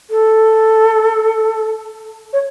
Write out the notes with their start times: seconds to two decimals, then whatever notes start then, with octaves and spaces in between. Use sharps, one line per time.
0.10 A4
2.33 C#5